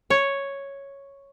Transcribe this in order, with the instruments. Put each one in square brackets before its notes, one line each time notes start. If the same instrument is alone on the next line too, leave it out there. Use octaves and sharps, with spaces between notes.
[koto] C#5